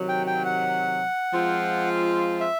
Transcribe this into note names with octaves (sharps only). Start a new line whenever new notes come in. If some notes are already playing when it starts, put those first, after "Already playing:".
Already playing: C3 D#3 F#3
G5
G5
F#5
F3 G#3 C4 F4
E5